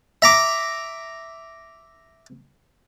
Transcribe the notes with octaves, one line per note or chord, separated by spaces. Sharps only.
E5 A#5 D6